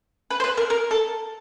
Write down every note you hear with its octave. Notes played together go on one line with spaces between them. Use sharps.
B4
C5
B4
A#4
A#4
A4